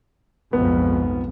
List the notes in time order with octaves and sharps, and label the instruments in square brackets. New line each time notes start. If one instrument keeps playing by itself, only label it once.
[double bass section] B1 F2 G#2 [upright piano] B3